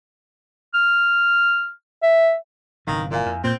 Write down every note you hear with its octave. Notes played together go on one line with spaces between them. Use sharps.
F6
E5
G1 C3 D#3 E3 C#4 D#4 F5
A#2 E4 F5 G#5
F2
A#2 C4 G6